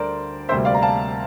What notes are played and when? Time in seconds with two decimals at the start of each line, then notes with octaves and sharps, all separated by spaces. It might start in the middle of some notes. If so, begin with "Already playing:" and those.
Already playing: D2 D3 G3 A#4 C5 D5
0.49 D2 C3 G3 A#3 C5 E5
0.65 D5 F5
0.74 A#5
0.82 F5 A5